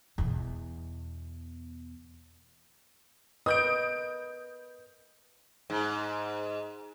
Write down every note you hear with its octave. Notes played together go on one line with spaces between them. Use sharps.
E2 B2
A#4 B4 D#5 D#6 G6 D7
G#2